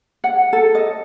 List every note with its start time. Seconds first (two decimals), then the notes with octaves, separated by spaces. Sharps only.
0.24 F#5
0.53 A4
0.75 D#5